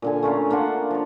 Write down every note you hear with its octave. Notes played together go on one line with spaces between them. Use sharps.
A#2 D3 G#5
A3 C#4 F4 A#4
A#3 D4 F4 F#5
F3 C#5